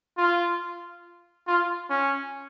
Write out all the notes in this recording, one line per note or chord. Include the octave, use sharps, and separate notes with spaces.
F4
F4
C#4